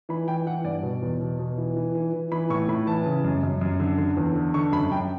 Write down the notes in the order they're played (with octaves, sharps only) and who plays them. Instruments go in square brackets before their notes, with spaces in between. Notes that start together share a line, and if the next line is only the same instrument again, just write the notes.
[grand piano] E3 B5
E3 G5
E3 F#5
G2 D5
B2
E2
B2
B2
E3
E3
E3
E3
E3 B5
A2 C#6
A2 B5
E3 A5
C#3
F#2
F#2
F#2
D3
D3
E2
D3
D3 C#6
F#2 B5
F#2 G5